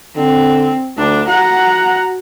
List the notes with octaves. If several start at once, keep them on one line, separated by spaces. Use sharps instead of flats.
D3 C4
D2 D4
F#4 F#5 A#5